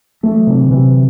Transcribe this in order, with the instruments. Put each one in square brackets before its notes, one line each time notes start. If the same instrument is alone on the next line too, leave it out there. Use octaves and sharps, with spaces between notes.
[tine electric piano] E3 [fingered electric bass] A3
[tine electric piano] F#3
[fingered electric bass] C3 [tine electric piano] E3
[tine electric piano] D3
[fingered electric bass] C3 [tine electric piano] E3